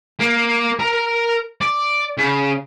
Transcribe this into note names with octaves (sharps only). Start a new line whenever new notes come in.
A#3
A#4 A#5
D5
C#3